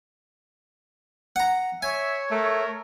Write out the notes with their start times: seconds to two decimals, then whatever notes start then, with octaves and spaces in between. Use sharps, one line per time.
1.36 F#5 A#5
1.83 C#5 E5 G#5
2.31 A3 A#4